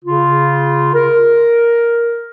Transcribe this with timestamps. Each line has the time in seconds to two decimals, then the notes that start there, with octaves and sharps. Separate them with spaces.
0.05 C#3 F4
0.94 A#4